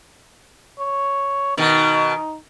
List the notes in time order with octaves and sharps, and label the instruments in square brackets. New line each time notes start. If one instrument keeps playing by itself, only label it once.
[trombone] C#5
[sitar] B2 D#3 [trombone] D#4